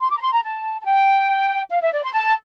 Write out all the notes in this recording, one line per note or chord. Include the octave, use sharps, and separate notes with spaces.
C6
D6
A#5
C6
A#5
A5
A5
G5
F5
E5
D5
C6
A5